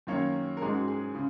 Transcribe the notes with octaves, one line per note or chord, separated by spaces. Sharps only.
F#2 D#3 A#3 C#4 C#5
A#4
G#2 G#3 C#4 G#4
F#4
G#4
C#3